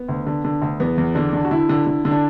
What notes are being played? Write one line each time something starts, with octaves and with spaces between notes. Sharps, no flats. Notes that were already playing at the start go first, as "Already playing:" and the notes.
Already playing: B3
D2
D3
D3
D2
E2 B3
E2
D3 D4
D3
F#4
D3 E4
D3
D3
D3
D4